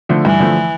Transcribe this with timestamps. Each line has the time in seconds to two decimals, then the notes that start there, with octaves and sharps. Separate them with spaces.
0.09 D3 F3 A3
0.25 G2 E3
0.40 D3 F3 A3